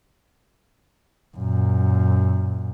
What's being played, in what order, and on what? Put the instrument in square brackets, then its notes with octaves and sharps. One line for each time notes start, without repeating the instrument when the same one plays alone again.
[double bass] F#2 A#2